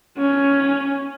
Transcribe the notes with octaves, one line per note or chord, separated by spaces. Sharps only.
C#4